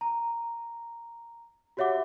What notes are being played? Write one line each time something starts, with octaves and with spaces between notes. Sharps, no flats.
A#5
F#4 G4 C#5 E5 F#5 D6